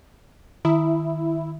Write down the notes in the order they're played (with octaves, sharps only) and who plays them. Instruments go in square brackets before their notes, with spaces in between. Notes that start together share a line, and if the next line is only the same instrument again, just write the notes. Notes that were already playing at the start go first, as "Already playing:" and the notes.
[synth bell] D#3 [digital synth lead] E4